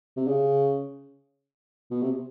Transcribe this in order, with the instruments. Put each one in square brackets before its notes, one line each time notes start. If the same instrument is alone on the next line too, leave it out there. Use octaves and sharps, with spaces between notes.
[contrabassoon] C3
C#3
B2
C3